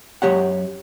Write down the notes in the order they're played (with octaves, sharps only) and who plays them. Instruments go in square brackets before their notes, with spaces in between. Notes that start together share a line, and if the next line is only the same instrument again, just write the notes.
[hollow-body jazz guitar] F#2 F#3 G4 C#5 F#5